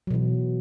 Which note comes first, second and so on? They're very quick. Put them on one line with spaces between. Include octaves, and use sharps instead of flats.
F#3 B2 E3